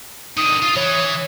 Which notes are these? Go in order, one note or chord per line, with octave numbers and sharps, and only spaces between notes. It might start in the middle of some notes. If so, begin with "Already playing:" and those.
D3 D#3 D#6
F4
E3 C#5